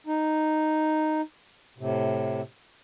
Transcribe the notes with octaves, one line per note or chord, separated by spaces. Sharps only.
D#4
A2 C3